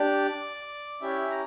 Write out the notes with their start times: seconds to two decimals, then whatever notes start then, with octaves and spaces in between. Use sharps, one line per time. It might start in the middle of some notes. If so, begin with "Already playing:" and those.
Already playing: D4 G4 D5
1.01 C#4 E4 G4 E5
1.30 A#5